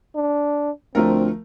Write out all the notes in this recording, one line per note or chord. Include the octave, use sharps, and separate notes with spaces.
D4
D2 F3 A3 C4 A#4